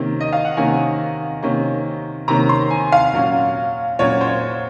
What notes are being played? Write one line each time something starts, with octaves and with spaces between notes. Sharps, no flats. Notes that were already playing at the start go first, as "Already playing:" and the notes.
Already playing: C3 D#3 A#3 C#4
D#5
F5
F#5
C3 D#3 A#3 C#4 G#5
C3 D#3 A#3 C#4
C3 D#3 A#3 C#4 A#5
C6
G#5
F5
A#2 F#3 C#4
A#2 F#3 C#4 C#5
C5
C#5